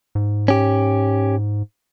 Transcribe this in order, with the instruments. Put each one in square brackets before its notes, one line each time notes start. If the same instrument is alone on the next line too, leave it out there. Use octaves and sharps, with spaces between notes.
[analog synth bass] G#2
[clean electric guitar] C#4 G4